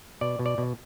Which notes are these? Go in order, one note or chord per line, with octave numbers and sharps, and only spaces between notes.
B2 D5
B2
D5
B2